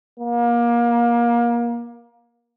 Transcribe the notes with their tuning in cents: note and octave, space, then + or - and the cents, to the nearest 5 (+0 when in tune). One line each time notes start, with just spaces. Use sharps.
A#3 +25